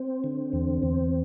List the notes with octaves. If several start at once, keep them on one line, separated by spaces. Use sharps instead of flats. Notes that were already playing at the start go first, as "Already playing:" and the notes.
Already playing: C4
D3
E2
E2